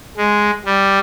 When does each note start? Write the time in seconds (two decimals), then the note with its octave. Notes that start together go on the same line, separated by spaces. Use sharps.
0.17 G#3
0.65 G3